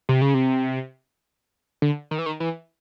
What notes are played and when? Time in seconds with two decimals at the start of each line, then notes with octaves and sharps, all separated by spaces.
0.09 C3
0.22 C#3
0.34 C3
1.82 D3
2.11 D#3
2.19 E3
2.26 D#3
2.40 E3